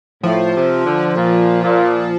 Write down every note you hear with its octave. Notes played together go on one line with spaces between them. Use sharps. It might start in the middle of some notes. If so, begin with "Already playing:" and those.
A2 F3
C3
D3
A#2
A#2